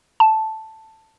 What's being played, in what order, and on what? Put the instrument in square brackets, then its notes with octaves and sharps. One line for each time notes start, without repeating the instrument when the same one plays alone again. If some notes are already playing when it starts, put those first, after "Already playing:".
[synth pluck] A5